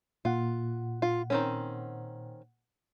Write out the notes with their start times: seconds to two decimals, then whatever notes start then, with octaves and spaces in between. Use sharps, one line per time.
0.25 A#2 F4 F#5
1.02 F4
1.30 D#3 C4 C#4